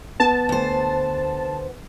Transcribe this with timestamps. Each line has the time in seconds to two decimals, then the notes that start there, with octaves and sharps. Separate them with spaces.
0.20 B3 A5
0.49 D2 C5